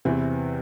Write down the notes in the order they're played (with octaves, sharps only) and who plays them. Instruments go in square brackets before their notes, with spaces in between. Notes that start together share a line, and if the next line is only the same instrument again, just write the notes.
[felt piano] E2 C3 E3 C4